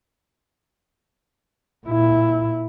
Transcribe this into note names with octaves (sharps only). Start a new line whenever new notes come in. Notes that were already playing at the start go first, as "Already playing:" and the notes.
A#2 E4